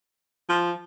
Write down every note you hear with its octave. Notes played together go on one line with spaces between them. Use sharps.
F3